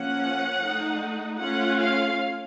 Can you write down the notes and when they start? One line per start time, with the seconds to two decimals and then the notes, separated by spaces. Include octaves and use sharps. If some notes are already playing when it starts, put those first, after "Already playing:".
Already playing: F3 A#3 C#4 F#5
0.62 A3 D#4
1.40 A3 C#4 F4 F#5
1.79 F5